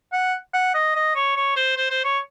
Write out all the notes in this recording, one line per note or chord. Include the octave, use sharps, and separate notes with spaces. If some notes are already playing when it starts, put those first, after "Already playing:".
F#5
F#5
D#5
D#5
C#5
C#5
C5
C5
C5
C#5